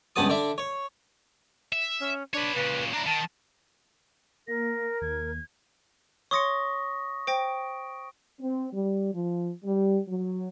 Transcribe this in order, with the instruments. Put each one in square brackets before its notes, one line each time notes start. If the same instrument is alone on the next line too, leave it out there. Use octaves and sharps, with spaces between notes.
[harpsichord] C#2 G2 B3 A5 D#6
D3 D4 E5
C#5
[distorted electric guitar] E5
[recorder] C#4
[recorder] D4 [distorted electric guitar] B4 C#5
[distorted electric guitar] A#2 C#3 [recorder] B4
[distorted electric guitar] D4 E4 [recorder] A#5
[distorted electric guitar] D#3 [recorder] A5
[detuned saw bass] A#3 [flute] A#4 [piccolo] A#6
[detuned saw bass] D#2 [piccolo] G#6
[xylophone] C#5 C6 C#7 [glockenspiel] C#6 D#6 A#6
[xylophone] C5 G5 A#6 [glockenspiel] D7
[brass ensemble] C4
G3
F3
G3
F#3